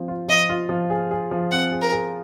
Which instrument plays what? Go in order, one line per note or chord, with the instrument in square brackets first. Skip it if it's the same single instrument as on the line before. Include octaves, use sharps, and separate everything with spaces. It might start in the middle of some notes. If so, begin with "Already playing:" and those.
Already playing: [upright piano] F3 C4
F4
[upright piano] F3 [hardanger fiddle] D#5
[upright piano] F4
F3
G#4
G#4
F3
[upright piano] C4 [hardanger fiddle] F#5
[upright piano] G#4
[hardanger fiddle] A#4
[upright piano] G#4